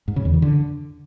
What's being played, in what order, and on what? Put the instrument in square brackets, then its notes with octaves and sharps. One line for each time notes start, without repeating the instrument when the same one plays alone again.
[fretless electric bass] G#2
C#3
E2
E3
D3